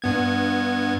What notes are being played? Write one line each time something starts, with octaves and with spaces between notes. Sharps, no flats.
G2 B3 G#6